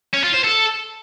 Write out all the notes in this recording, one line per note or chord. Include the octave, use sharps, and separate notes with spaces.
C#4
F4
C5
A4